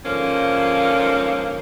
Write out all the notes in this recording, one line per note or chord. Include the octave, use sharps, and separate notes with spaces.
G#2 D3 F3 A#3 C#4